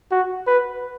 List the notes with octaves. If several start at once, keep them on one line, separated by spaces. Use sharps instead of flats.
F#4
B4